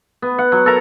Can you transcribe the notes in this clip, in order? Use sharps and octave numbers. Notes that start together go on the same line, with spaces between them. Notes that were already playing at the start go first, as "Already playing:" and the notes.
B3
F#5
F#3
A4 A#4 A#5